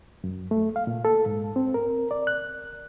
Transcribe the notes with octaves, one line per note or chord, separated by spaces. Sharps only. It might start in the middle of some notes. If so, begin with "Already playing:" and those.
F#2
A3
F5
A#2
A4
G#2
C4
A#4
D5
F#6